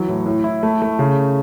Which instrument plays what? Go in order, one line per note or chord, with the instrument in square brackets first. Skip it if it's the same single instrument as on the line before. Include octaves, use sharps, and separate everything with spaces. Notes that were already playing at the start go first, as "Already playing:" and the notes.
Already playing: [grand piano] E3 F#3
A2
A2
E4
A3
A3
C#3